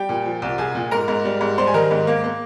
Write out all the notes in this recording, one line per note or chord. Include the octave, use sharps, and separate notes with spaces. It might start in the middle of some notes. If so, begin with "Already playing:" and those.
Already playing: G3 G4 G5
A#2
F3
C2
C2 G#4 G#5
A#2
G#2 A#4 A#5
G#2
G3
G#2
G3 C5 C6
G#5
D#3 A#4 A#5
G#2
A#3
A#3